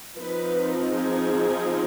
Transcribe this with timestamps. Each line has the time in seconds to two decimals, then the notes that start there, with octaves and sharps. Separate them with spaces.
0.18 F3 C4 D#4 B4
0.90 G#4